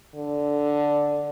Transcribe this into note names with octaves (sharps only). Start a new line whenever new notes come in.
D3